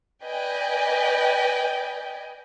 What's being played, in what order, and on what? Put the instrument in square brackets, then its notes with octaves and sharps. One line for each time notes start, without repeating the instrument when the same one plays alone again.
[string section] B4 D5 D#5 G5 G#5